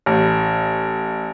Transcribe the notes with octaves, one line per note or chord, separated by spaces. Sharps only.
A1